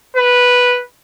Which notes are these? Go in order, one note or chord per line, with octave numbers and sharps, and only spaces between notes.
B4